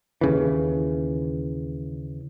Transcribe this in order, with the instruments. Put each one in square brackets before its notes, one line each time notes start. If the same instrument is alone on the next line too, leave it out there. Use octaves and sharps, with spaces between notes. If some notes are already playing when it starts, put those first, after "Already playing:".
[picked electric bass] D#2 C#3 E3